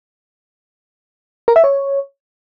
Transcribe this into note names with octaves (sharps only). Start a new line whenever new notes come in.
A#4
E5
C#5